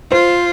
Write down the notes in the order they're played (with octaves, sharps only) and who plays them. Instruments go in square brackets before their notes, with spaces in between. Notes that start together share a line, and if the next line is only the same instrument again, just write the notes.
[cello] F4 [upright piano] C5